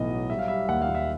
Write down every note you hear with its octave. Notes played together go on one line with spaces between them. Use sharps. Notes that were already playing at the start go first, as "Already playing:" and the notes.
Already playing: B1 A2 E3 B3 D#5
F#3
G3 E5
F5
G3 E5
D#2 F#5
F5
D#2
E5